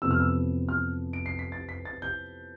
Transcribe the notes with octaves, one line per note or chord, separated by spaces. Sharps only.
F2 C3 E3 B3 E6
F6
E6
F6
D7
C7
B6
A6
B6
A6
G6